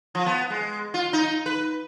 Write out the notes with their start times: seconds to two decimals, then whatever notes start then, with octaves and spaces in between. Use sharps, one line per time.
0.15 F3
0.26 B3
0.50 G#3
0.94 F4
1.13 D#4
1.46 B4